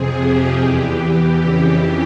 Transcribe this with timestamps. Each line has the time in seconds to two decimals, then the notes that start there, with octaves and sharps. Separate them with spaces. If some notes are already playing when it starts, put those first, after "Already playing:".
Already playing: F2 C3 F3 G#4
0.20 G4
0.60 E2 E3
1.39 F2 C#3 E3 G4